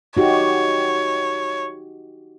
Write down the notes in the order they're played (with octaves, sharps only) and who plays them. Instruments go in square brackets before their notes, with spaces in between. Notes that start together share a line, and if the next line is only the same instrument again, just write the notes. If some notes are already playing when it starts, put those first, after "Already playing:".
[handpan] D#4 F#4 G4 [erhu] C#5